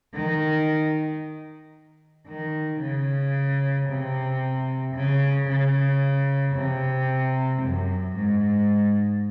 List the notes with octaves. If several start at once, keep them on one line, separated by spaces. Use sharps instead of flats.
D#3
D#3
C#3
C3
C#3
C#3
C3
F#2
G#2